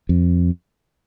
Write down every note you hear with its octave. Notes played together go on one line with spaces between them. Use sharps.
F2